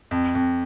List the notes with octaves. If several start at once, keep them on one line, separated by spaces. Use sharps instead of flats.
F2
F2